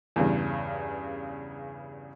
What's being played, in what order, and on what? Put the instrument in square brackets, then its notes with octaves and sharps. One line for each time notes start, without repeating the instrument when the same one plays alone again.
[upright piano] E2 G2 C#3